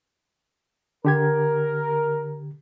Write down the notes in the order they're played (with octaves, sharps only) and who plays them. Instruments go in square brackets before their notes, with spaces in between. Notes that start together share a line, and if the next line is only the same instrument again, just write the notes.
[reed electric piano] D3 G4 G#6 [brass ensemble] A#4